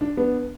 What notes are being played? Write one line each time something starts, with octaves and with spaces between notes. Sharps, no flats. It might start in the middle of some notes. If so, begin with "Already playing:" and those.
D4
B3 D4